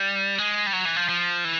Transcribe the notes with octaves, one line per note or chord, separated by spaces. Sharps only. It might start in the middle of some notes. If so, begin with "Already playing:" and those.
Already playing: G3
G#3
G3
F#3
E3
F3
F3
E3